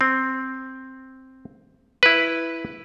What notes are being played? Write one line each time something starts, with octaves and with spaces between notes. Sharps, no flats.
C4
E4 B4